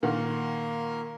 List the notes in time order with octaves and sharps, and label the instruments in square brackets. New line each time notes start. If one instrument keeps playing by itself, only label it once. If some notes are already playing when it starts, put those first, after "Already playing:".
[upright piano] A#2 D#3 F#5 [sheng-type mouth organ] A#3 A#4